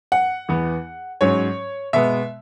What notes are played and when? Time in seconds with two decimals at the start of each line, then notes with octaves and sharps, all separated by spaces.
0.12 F#5
0.49 E2 E3 B3
1.21 G#2 F#3 C#4 C#5
1.93 B2 G#3 B3 E5